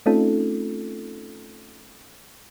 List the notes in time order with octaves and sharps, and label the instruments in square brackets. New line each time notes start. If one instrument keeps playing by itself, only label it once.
[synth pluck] A3 C4 C#4 D#4 F4 A4